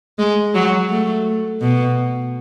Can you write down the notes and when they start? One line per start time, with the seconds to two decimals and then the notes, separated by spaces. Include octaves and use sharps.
0.19 G#3
0.55 F#3
0.90 A3
1.61 B2